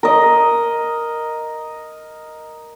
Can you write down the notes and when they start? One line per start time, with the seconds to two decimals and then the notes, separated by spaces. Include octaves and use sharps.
0.03 A#4 D#5